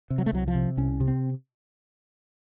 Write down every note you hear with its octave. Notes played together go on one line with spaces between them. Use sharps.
C3
F#3
A3
C2 F#3
F3
C3
C2 C#4
C3
C4